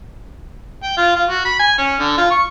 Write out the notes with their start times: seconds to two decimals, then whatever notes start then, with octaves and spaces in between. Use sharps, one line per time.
0.83 G5
0.97 F4
1.15 F4
1.28 F#4
1.45 B5
1.59 G#5
1.78 C#4
1.99 D3
2.18 F4
2.31 C#6